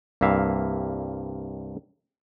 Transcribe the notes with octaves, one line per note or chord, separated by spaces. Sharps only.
C2 G2 A#3 E5 F5